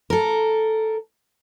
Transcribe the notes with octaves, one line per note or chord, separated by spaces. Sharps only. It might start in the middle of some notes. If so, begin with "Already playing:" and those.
A4 A#4